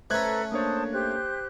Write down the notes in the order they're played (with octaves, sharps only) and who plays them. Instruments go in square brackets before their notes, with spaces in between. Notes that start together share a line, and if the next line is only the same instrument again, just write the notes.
[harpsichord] A3 C#4 [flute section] A4 B4 A#5 [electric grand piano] C5 F#6 G#6
[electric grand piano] A#3 D4 C#5 [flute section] C5 A5 D#6
[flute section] G4 C5 F#6